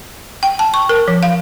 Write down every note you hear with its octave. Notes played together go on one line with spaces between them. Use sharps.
G5
A5
C#6
A#4
F3
F5